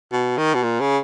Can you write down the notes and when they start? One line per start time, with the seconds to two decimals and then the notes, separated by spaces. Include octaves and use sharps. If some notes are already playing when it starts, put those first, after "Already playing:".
0.12 B2
0.38 D#3
0.54 B2
0.63 A#2
0.80 C#3